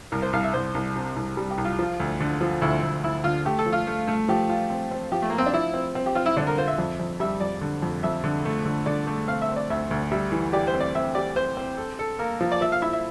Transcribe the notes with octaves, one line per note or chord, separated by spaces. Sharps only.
C2 A#4
C5
C2 F5
E5
C2 C5
C2
C3
C2
G3
G4
C2
F4
F3
D2
D3
F3
D2 E4
D2
D2 E4
D3 F4
A3 G4
A4
F3
F4
A3
A3
F3 G4
F4
C4
C4
F3 G4
A3
A#3
F4
C4
D4
F3 E4
C4
C4
G4
C4 F4
E4
D3 D4
A#4
F4 C5
E5
F2
F2
G3 E5
F2 D5
D3
F2
F2 E5
D3
A3
D3
D3 D5
A3
C4 F5
E5
C4
D5
D2 E5
D2
G3 E5
E3
G4 D5
C5
C4
D5
C4 E5
G4 D5
C4 C5
C4
A4
A4
A#3 A#4
F3
D5
F3 E5
F5
E4 E5
E5